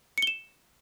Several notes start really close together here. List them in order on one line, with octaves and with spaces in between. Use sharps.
C#7 G7 E7